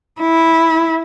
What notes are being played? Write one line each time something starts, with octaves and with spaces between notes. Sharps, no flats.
E4